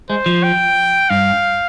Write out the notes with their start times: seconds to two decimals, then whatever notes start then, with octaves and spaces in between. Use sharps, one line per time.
0.10 G#3 C5
0.26 F3
0.43 G5
1.10 G2 F5